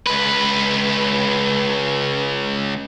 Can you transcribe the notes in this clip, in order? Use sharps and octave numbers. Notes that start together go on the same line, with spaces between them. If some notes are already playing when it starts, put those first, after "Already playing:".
C#2 B4